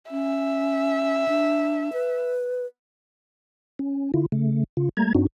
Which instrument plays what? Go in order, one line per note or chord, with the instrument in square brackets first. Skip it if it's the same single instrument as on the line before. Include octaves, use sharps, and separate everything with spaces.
[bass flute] C#4 [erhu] E5
[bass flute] D4
B4
[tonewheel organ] C#4
D3 E4 F4
C#3 A3
C#3 F4
G3 A3 A#3 A#5 G#6
G2 C4 D4 D#4 F#4